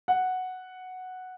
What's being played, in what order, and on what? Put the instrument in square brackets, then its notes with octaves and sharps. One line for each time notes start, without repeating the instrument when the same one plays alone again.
[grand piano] F#5